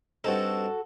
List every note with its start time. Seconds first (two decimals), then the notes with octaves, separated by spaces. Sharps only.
0.24 G2 C4 D#4 F#4 A4